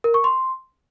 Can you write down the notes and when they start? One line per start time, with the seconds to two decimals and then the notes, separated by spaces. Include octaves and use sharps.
0.04 A#4
0.14 C#6
0.24 C6